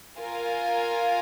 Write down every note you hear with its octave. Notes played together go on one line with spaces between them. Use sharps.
F4 A#4 F5 G#5